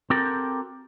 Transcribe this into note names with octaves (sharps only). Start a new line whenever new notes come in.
C4 F#4 G4 A4 A#4